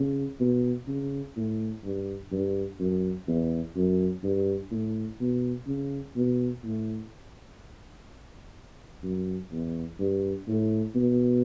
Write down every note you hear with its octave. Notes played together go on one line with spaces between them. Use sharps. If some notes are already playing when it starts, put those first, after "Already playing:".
Already playing: C#3
B2
C#3
A2
G2
G2
F#2
E2
F#2
G2
A2
B2
C#3
B2
A2
F#2
E2
G2
A2
B2